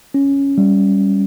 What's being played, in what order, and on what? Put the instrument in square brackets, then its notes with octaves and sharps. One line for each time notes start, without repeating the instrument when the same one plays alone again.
[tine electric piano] C#4
G3